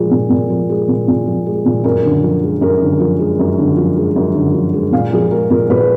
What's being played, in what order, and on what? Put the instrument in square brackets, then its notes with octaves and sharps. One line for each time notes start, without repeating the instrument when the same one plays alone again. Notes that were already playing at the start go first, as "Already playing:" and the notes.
Already playing: [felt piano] A#2 F3 G#3
A#2
A#2
F3
G#3
A#2
A#2
F3
G#3
A#2
F#2 A#4
D3
F3
G#3
F#2 A#4
D3
F3
G#3
F#2
D3
F3
G#3
F#2
D3
F3
G#3
A#2 F5
F3 G#4
G#3 A#4
A#2 A#4
A#2 B4